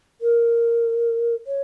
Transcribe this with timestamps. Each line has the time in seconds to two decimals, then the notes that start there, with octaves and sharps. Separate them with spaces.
0.21 A#4
1.47 C#5